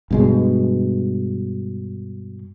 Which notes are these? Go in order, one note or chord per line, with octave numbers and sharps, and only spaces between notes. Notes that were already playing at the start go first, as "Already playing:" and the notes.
G2 B2 G#3